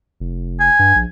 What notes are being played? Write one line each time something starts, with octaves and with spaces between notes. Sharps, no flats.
F1
G#5
G2
A#1